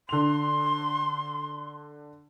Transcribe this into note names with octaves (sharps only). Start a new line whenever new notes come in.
D3 C6 F7